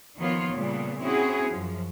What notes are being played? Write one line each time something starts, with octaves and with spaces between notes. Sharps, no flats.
D#3 F3 A#3 B3 F4 C#5
A#2 C#3 G3 A3 B3
C4 C#4 E4 F#4 G#4
F#2 F3